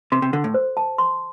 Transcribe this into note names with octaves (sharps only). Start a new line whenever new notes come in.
C3 C6
C3
D3 A4
A2
C5
A5
C6